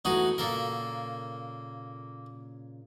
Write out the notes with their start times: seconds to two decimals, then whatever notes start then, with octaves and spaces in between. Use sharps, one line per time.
0.05 E2 E3 A3 D#4 F#4 G#4
0.38 A#2 C#3 A#3 A4 A#4